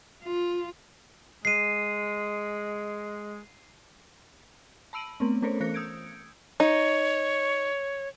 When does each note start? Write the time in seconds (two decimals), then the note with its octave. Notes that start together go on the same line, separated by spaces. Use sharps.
0.24 F4
1.45 G#3 C7 D#7
4.93 A5 B5 E6 D7 D#7 F#7
5.20 A3 B3 C4
5.42 A3 C#4 A4 A#4 C5 C#5
5.60 E3 C5 F#6 A#6 C#7
5.74 D#6 E6 G6 G#6 C#7 D7
6.60 D#4 C#5